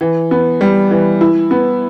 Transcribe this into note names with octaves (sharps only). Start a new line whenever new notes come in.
E3
B3
G3
E3
E4
B3